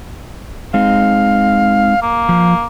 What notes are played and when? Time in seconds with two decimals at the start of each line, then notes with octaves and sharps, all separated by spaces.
0.74 G#3 C4 D#4 F5
2.02 A#3
2.29 F3